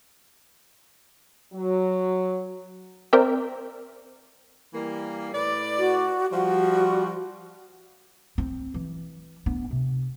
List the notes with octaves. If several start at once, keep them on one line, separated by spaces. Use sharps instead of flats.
F#3
C4 A#4 D5 E5 G5
E3 G3 A#3
A2 B4 D5
F#4
F3 G3 F#4
C4
E3
B3 D4
C3